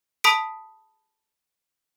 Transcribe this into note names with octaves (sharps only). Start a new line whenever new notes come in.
A5 B5 D#6 B6 D7